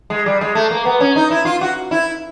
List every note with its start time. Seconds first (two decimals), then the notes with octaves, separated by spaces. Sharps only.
0.10 G#3
0.26 G3
0.41 G#3
0.55 A3
0.71 A#3
0.85 B3
1.00 C#4
1.16 D#4
1.31 E4
1.45 F4
1.61 F#4
1.91 E4